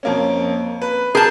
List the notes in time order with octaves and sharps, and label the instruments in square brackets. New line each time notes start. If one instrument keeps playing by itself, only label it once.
[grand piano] F2 A#3 C#4
B4
[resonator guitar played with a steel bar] G#4 A5 [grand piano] A#4 G6